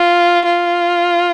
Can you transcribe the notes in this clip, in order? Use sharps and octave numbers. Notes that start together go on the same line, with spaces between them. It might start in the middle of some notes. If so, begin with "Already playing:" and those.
Already playing: F4
F4